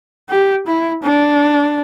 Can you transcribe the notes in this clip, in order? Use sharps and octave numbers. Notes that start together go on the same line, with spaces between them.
G4
E4
D4